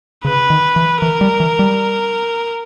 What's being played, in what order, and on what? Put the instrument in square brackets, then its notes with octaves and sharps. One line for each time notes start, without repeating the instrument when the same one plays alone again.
[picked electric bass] C#3 [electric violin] B4
[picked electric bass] D#3
E3
[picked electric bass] E3 [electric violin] A#4
[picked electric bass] G3
E3
G3